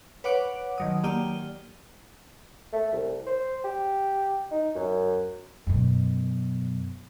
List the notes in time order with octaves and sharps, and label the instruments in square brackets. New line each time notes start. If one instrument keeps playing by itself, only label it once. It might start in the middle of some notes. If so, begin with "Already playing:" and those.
[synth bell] B4 C#5 F#5 D6 F#6 D7
D#3 F#3 D#6
A#3 G4 D5 F6 D#7 G7
[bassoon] A3
C2
C5
G4
D#4
F#2
[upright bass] F#2 B2